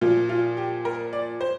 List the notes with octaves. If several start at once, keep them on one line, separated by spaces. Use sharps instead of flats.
A#2 F3 F4
F4
G4
A#4
D5
C5